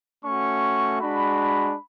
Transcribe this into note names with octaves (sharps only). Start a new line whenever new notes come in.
A3 C#4 F#4 C#6
G#3 D4 F#4 B5